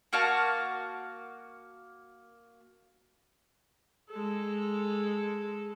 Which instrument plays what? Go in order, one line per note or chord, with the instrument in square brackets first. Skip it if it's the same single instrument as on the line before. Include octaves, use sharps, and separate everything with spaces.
[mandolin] A#3 F#4 F5 A5
[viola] G#3 A4